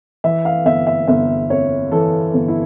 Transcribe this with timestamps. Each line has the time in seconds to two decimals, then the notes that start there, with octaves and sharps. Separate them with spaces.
0.24 E3 E5
0.45 F5
0.66 G1 E5
0.87 E5
1.08 G1 E5
1.50 F2 C#5
1.92 E3 A4
2.34 G1
2.48 E4